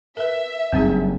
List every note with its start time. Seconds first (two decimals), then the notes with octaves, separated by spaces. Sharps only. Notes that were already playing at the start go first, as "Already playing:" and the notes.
0.17 A#4 B4 E5
0.72 F#1 G2 C4 D#4 G#4